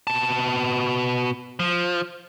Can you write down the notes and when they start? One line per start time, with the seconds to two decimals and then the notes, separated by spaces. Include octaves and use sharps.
0.07 B2 A5
1.59 F3